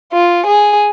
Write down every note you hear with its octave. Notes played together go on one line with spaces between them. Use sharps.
F4
G#4